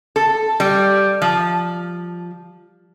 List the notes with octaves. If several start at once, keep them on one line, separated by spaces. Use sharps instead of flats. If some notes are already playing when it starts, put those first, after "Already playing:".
A4
G3
F3